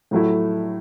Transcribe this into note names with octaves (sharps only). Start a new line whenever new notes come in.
A2 F#3 A3 E4